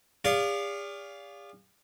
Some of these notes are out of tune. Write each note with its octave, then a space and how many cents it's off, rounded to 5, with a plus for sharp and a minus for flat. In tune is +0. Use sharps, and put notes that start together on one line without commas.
G#4 -45 D5 -35 F5 +0